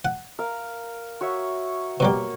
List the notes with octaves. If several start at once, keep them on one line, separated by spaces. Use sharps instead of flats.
F#5
A#4 F5
F#4 C#5 E5
B2 F#3 G3 A#3 C#5